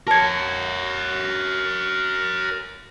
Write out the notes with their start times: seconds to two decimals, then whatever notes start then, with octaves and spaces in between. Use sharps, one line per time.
0.08 A#4 C#5 A5 G#6